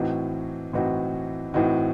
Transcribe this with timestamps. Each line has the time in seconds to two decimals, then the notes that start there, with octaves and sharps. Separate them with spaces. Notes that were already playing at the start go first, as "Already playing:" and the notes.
Already playing: A2 E3 C4 D#4 F#4
0.73 A2 E3 C4 D#4 F#4
1.54 A2 E3 C4 D#4 F#4